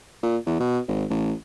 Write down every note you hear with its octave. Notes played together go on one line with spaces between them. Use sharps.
A#2
E2
B2
G#1
A1